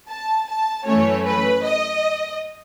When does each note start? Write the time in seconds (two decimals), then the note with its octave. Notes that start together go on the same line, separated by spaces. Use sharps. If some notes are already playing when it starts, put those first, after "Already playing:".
0.09 A5
0.48 A5
0.86 F#2 E3 A3 C#4 C#5
1.25 B4
1.63 D#5